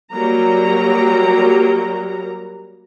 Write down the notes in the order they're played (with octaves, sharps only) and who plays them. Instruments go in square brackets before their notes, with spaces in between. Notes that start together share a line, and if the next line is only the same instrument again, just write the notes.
[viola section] F#3 G3 A#3 A#5